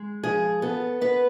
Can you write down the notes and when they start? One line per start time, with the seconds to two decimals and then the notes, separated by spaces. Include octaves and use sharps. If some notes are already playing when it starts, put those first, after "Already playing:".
Already playing: G#3
0.23 F3 G#4
0.62 B3 A4
1.01 B3 B4